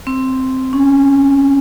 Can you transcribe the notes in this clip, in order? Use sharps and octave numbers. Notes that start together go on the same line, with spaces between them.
C4
C#4